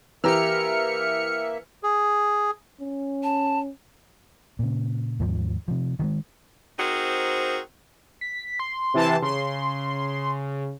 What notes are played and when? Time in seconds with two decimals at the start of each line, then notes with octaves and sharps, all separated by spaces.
0.24 E3 A#3 G4 E5 A#5 E6 F6 C#7
1.83 G#4
2.80 C#4
3.23 A5
4.59 A#2 C#3
5.20 D#2 G#2 F3
5.68 C3 F3
5.99 D#3 F3 G#3
6.79 C4 D#4 F#4 G#4 A#4 C5
8.21 B6
8.59 C6
8.94 C3 E3 A5
9.22 C#3 C6